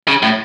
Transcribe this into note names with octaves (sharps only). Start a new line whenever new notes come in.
C#3
A2